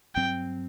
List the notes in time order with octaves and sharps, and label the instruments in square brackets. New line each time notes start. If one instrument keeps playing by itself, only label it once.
[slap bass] G2 F#3 C4 [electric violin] G5